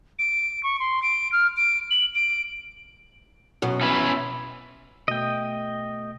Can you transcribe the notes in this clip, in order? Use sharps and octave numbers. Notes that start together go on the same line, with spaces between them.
D7
C#6
C6
D7
F6
D7
F#7
D7
F#2 B2 F#3
C#4 E4 B4
B2 A3 D#5 G5